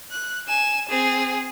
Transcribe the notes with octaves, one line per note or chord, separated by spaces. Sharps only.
F#6
G#5 E7
C4 G#4